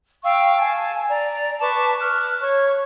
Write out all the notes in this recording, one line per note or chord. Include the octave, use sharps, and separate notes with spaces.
F5 G5 C#6 E6
G#5 A5
D5 A#5
B4 A5 C#6 D6
F6 F#6
C#5 C#6